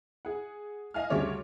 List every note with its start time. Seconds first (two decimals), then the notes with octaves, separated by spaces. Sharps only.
0.25 G#4 F#5
0.94 D#5 F5 G#5 F6
1.10 D2 C#3 G3 A3 C#5 D6